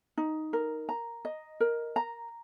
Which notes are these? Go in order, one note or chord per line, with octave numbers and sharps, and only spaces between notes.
D#4
A#4
A#5
D#5
A#4
A#5